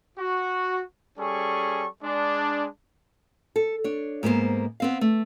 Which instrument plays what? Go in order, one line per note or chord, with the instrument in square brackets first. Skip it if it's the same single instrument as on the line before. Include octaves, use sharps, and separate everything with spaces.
[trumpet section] F#4
G3 C#4 G#4 A4 C#6
G#3 D4
[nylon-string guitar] A4
D4 C#5
G#2 A#3 B3 C5
B3 C4 F5
A3